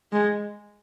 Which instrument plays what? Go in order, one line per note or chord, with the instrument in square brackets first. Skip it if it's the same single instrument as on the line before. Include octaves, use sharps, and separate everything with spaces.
[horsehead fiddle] G#3